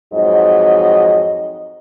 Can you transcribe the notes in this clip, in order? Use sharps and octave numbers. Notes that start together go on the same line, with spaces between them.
F2 G#2 F#3 D#5